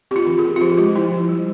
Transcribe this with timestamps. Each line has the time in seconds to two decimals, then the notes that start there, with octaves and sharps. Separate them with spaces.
0.11 C4 G4
0.16 F4
0.27 E3
0.39 G#4
0.44 C4
0.56 F4
0.61 F3 G4
0.78 G#3 G4
0.96 F3 E4
1.12 F3
1.29 G3